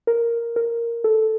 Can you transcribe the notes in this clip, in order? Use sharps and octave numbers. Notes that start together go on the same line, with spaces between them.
A#4
A#4
A4